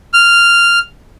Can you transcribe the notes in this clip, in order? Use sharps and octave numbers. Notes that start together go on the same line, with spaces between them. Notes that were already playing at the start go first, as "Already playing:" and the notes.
F6